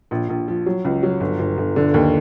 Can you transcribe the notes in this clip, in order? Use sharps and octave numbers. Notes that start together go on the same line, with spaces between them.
A#1
A#1
F3
F#3
C#2
F#3
G1
G1
G1
D3
D#2